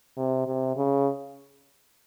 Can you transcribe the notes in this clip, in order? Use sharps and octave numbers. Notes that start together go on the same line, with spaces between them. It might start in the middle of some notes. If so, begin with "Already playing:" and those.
C3
C3
C#3